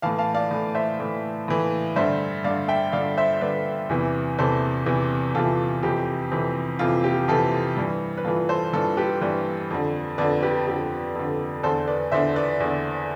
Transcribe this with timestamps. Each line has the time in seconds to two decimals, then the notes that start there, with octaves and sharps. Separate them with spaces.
0.02 E3 F5 A5
0.06 A2
0.18 F5 A5
0.35 D5 F5
0.51 A2 E3
0.75 C5 E5
1.00 A2 E3
1.48 A2 E3
1.96 G2 D3 C5 E5
2.44 G2 D5 F5
2.48 D3
2.68 E5 G5
2.92 G2 D3 D5 F5
3.17 C5 E5
3.41 G2 D3 B4 D5
3.89 E2 C3 E3
4.38 E2 C3 E3 A4 C5
4.86 E2 C3 E3
5.35 E2 C3 E3 F4 A4
5.83 F2 C3 E3 G4
6.31 F2 C3 E3
6.79 F2 C3 E3 F4
7.04 G4
7.28 F2 C3 E3 F4 A4
7.77 G2 E3
8.17 B4
8.25 G2 F4 A4
8.28 E3
8.49 A4 C5
8.73 G2 E3 F4 A4
8.97 G4 B4
9.21 G2 E3 B4 D5
9.70 F2 D3
10.18 F2 D3 B4 D5
10.42 G4 B4
10.67 F2 D3 G4
11.15 F2 D3
11.63 E2 D3 A4 C5
11.88 B4 D5
12.12 E2 D3 C5 E5
12.36 B4 D5
12.60 E2 D3